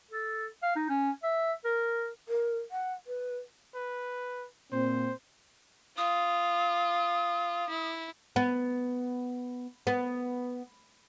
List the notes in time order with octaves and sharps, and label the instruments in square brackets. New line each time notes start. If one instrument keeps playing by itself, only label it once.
[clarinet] A4
F5
D#4
C#4
E5
A#4
[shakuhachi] A#4
F#5
B4
[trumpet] B4
[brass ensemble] A#2 C4 [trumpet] C5
[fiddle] F4 [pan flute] D#6
[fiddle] E4
[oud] B3
B3